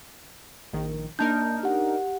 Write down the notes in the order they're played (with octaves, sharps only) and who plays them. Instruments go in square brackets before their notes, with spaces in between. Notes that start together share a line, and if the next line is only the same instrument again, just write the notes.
[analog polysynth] A#1 D#3
[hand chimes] A#3 A5 G6 [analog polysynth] D4 D#4 A#4
[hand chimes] G4 F#5